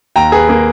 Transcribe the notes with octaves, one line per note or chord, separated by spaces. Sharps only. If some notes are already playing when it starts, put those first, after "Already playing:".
D#2 G5 A#5
G#4 B4
A#3 G#4